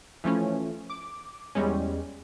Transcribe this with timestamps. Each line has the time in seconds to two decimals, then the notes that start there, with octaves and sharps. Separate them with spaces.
0.24 E3 F3 A3 C#4
0.90 D6
1.55 E2 G3 G#3 C#4